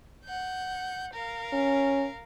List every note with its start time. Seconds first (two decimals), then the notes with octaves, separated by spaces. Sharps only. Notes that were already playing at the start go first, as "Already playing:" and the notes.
0.24 F#5 G6
1.12 A#4 F5
1.53 C#4